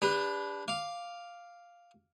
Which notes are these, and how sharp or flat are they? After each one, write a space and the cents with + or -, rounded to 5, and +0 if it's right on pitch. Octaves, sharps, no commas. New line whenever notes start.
D4 -20 G4 +40 B4 +0
F5 +0 D6 +0